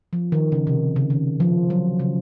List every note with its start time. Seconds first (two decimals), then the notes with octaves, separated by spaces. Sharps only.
0.13 F3
0.32 D#3
0.52 C#3
0.67 C3
0.96 C#3
1.10 D#3
1.40 F3
1.70 F#3
2.00 C#3